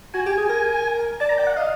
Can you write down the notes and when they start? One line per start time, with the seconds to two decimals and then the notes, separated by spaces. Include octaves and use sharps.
0.14 F#4 G#5
0.26 G4
0.37 G#4
0.49 A#4
1.20 D5 A5
1.29 A#5
1.38 D5 G5
1.47 F#5
1.56 D#5 F5